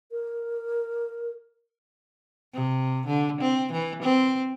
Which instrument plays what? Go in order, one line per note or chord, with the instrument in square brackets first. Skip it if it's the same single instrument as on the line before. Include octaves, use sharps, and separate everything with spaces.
[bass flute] A#4
[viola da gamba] C3
D3
C4
E3
C4